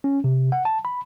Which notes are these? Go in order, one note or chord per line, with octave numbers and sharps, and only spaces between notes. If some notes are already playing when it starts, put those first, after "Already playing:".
C#4
C3
F#5
A5
B5